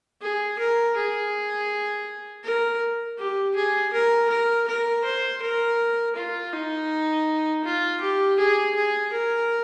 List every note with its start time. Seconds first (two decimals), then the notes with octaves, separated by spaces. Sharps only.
0.22 G#4
0.59 A#4
0.96 G#4
2.45 A#4
3.18 G4
3.56 G#4
3.93 A#4
4.30 A#4
4.68 A#4
5.04 C5
5.42 A#4
6.16 F4
6.53 D#4
7.64 F4
8.01 G4
8.39 G#4
8.76 G#4
9.13 A#4